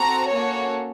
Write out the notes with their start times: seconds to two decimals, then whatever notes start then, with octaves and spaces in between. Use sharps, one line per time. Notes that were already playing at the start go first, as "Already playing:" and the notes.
Already playing: C4 F#4 A4 A#5
0.29 A#3 C#4 F#4 A4 C#5